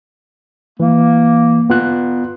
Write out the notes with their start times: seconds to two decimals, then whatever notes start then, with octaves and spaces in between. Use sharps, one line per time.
0.80 E3 A#3
1.70 B3 F4 F#6